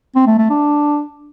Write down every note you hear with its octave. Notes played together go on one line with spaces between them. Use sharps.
C4
A3
A3
D4